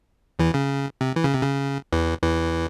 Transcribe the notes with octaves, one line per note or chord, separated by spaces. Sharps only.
E2 E3
C#3
C3
E3
C#3
C3
C#3
E2 E3
E2 E3